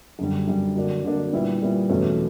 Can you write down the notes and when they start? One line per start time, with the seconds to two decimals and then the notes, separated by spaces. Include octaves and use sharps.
0.19 F#2 D3 G3
0.48 F#2 D3 G3
0.76 D3 F#3 A#3 D4
1.04 D3 F#3 A#3 D4
1.33 A#2 G3 B3 E4
1.62 A#2 G3 B3 E4
1.89 E2 B2 F#3 A3 C#4